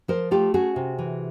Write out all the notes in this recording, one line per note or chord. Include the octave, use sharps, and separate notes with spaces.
F3 A#4 C5
A3 F4 G4
C#4 F#4 G#4
C3
E3